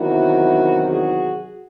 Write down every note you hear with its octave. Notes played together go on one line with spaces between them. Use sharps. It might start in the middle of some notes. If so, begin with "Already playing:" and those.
Already playing: E2 C3 D#3 F#3 E4 F#4
F#4 G#4